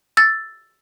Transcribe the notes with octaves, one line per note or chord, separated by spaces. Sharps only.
E6 A6